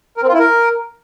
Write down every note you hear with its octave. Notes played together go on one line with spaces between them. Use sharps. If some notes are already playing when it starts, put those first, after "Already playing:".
A#4
C4
F4
E4
A#4